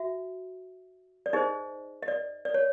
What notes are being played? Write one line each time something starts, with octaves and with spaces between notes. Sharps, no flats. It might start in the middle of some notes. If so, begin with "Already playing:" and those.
Already playing: F#4 E5
D5
D#4 G#4 C5 D#5
D#5
D5
D5
C#5